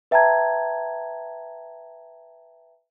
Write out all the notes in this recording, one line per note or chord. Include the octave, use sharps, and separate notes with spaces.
B4 E5 G5 A5 A#5 G#6